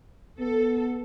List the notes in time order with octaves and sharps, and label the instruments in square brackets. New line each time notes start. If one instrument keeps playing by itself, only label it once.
[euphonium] B3 [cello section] A4